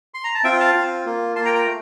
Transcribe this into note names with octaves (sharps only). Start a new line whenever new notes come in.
C6
A#5
A5
C4 F4 E5 G5
F5 A5
C4 F4
A#3 F4
A#3 F4 A5 C6
G5 A#5
G5 A#5
A3